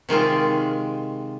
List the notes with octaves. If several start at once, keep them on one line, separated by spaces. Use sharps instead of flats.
C3 D#3 G#3 F4